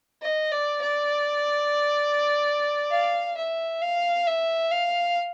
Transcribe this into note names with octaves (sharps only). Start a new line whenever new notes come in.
D#5
D5
D5
F5
E5
F5
E5
F5